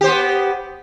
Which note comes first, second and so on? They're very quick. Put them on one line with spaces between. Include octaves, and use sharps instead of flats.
G4 C5 B3